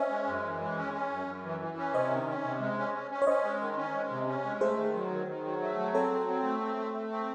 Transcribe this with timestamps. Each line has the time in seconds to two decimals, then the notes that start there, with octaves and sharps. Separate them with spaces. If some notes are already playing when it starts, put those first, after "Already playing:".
Already playing: C#4 C5 C#5 D#5 E5
0.10 G#3
0.28 F#2
0.44 E3
0.60 G#3
0.77 C#4
0.94 C#4
1.11 F#2
1.27 F#2
1.44 E3
1.60 E3
1.78 C#4
1.94 C3 C5 D#5
2.10 D#3
2.27 C#4
2.44 C3
2.60 G#3
2.78 C#4
2.94 C#4
3.11 C#4
3.22 C#5
3.27 C#4 C5 D#5
3.44 G#3
3.60 D#3
3.77 C#4
3.95 G#3
4.10 C3
4.28 C#4
4.44 G#3
4.60 A3 G#4 C5
4.78 D#3
4.94 F#3
5.10 D#3
5.27 D#3
5.44 F#3
5.61 A3
5.77 F#3
5.94 C4 A4 C#5
6.11 F#3
6.28 C4
6.43 A3
6.60 C4
6.77 A3
6.94 A3
7.11 C4